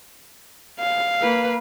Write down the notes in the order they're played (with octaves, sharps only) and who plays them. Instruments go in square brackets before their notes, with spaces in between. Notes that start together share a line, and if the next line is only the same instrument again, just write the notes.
[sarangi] F5
[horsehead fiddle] A#3 B4